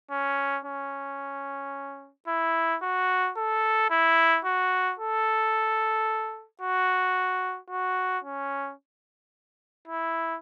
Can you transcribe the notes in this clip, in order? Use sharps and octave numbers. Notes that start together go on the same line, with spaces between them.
C#4
C#4
E4
F#4
A4
E4
F#4
A4
F#4
F#4
C#4
E4